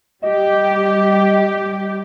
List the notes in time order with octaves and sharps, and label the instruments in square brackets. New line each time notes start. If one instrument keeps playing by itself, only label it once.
[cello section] G3 G4 [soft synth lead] D#5